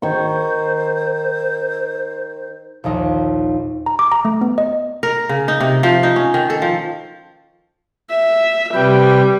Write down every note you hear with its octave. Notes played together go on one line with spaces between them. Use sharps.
D#3 C5 C#6
A#1 D#2 D#4
A#5
D6
A#5
A3
B3
D#5
A#4
C#3
D#4
C3
F3
D#4
C#4
D#3
A4
F3
E5
C3 G3 B4 G5